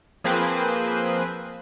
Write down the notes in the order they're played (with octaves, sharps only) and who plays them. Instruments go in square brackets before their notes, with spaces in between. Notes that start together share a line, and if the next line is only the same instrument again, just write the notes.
[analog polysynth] F3 A#3 C4 G#4 B4 C5